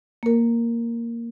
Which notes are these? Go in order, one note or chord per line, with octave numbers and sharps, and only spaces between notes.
A#3 A#4